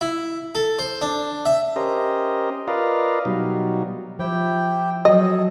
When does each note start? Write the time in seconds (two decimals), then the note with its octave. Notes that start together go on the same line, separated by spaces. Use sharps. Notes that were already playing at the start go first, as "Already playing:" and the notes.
0.01 E4
0.55 A4
0.79 C5
1.01 D4
1.45 E5
1.76 C#4 G4 A#4 C5 D#5
2.68 F4 A#4 B4 D5 D#5 F5
3.25 B2 F#3 G3 D#4
4.19 F3 E4 G4 G5
5.05 F#3 F#4 G#4 A4 D#5